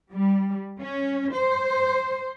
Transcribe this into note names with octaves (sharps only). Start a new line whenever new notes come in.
G3
C#4
C5